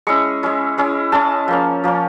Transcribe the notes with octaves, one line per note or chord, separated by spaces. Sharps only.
G#3 C#4 E4 C#6
G#3 C#4 E4
G#3 C#4 E4
G#3 C#4 E4 A5
F3 A#3 C#4
F3 A#3 C#4